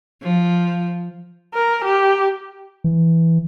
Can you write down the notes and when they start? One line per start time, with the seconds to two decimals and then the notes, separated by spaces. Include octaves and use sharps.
0.22 F3
1.54 A#4
1.85 G4
2.84 E3